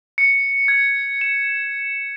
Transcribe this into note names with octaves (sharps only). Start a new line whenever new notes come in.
C#7
G#6
E7